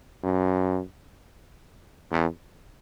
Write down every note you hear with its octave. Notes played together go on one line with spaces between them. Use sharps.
F#2
E2